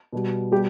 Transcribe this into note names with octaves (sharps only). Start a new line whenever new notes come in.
B2 G3
B2 G3 G4